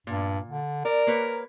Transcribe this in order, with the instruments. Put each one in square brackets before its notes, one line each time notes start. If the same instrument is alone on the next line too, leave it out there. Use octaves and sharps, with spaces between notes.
[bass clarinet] G2 [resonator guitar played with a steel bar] A#2
[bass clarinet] D3
[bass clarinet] A#4 [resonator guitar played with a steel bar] D5
[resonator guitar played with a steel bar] A#3 B4 C#5